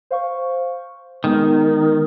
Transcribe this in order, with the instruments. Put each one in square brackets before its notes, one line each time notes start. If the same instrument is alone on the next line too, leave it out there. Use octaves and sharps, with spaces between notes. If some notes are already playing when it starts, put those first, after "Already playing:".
[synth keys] C5 F5 C#6
[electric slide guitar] D#3 [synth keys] G#3 B3 A#4